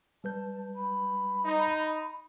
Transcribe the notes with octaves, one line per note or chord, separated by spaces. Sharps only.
G3 B4 A5 G6
B5
D#4